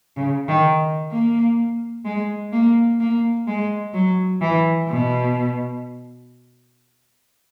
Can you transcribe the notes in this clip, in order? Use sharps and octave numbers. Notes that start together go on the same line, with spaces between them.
C#3
D#3
A#3
G#3
A#3
A#3
G#3
F#3
E3
B2